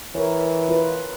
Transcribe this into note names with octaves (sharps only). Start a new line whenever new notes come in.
E3 A#4 C#5
F4 B4